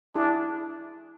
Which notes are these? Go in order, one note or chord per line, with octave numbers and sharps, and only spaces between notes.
D4 E4 G#4